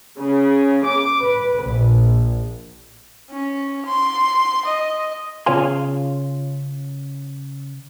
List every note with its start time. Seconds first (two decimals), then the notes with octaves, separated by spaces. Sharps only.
0.19 C#3
0.86 D6
1.22 B4
1.63 A#1
3.31 C#4
3.86 C6
4.66 D#5
5.46 C#3 F4 C#5 F5 G#5 C6